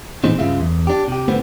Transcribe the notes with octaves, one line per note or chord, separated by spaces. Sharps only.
A#2 E3 G#3 C4 D#4
C#2 G2 C#3 G#3 F4 E5
E2
D4 G4
C3 G4
A2 D3 B3 C4